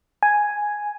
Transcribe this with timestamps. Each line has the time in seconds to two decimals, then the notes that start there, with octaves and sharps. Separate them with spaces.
0.23 G#5